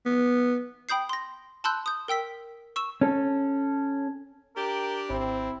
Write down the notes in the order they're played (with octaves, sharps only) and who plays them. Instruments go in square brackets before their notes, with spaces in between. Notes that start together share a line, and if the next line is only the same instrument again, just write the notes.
[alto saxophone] B3
[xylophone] G5 B5 D#6 G6 C7
C6 A#6
A5 B5 C6 E6 F#6 G6
D#6 G6
A#4 G5 E6 B6
C#6 E6 E7
[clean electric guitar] C#4 A4
[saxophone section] D4 G4 [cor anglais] A#4
[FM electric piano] G#1 [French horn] C4 [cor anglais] E4